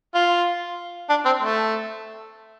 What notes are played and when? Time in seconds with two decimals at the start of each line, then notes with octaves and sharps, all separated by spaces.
0.15 F4
1.10 D4
1.25 C4
1.42 A3